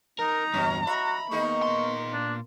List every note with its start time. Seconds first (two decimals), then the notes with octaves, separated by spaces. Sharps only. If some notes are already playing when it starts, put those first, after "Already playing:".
0.19 D#4 A#4 A#5
0.54 E2 G2 B2 C#4
0.87 F#4 E5 B5
1.31 D#3 G#3 A#3 B3 D#4 C#6
1.62 A#2 C6
2.13 D4